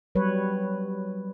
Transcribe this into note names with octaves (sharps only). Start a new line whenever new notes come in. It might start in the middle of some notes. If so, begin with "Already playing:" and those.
F#3 G3 B4 C#5